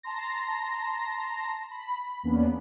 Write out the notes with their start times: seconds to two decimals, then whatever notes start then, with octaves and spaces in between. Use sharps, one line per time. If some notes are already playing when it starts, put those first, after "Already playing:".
0.03 A5 A#5 C6 A#6
1.71 B5
2.23 E2 A#3 B3 C#4 D4